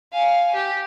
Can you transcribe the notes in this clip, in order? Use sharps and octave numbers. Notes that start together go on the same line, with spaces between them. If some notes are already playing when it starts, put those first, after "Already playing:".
F5 G#5
G4